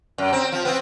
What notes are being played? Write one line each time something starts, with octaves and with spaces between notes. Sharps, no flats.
F#2
C4
F3
B3 C4